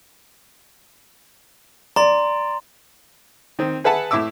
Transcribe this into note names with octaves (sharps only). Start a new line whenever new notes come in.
D5 A#5 C6
D#3 C4
G#4 B4 E5 F#5 A5
A2 E4 E5 D6 E6